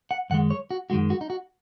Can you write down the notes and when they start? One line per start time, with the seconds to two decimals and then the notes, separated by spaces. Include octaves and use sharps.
0.11 F#5
0.30 F#2 D#3 G#3 F#5
0.51 C#5
0.71 F#4
0.90 F#2 D#3 G#3 F#4
1.10 F#4
1.21 D#4
1.30 F#4